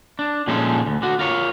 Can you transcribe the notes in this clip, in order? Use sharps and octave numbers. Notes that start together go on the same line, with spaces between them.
D4
A#2 F3 G#3 C#4 D#4 A4
D2
D3 F#4
F4 A#4 C#5